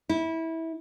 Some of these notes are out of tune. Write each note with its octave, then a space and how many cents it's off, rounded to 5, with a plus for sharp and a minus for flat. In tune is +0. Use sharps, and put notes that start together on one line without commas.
E4 -20